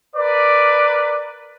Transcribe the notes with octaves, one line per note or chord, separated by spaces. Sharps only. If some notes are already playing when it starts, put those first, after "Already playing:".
A#4 B4 D5